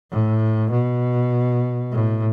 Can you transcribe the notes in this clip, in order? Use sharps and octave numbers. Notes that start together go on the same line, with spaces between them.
A2
B2
A2